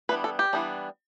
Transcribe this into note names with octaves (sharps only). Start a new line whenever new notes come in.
E3 G3 B3 D4 B4
A4
G4
E3 G3 B3 D4